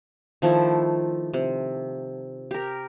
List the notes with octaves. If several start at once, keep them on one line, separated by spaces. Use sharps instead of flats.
D#3 F3 A3 E4
C3
G4 A#4